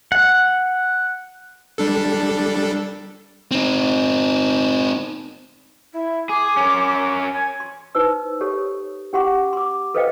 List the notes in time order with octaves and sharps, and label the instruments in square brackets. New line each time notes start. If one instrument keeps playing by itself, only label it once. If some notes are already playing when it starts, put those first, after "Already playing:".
[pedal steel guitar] F#5
[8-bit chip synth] G3 D4 A4
[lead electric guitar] C4 D#4
[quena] E4
[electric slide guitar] G#4 [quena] D6
[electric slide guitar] C#4 A#4
[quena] G#5
[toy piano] C6
D#4 B4 C5 E6
G4 A4 C#5
C#4 G4 F#5 C6 D6
C6 D6
A4 B4 C5 D#5 F5 G5